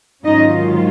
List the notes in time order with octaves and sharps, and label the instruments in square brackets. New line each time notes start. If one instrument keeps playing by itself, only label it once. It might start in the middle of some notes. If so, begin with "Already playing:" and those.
[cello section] G#2 D#3 F#3 C#4 D#4 F4 D#5